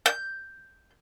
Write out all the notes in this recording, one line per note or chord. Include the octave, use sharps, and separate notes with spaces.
G6